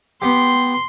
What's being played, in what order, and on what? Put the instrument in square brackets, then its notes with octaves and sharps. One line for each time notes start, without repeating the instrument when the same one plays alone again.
[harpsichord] B3 G4 [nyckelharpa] C6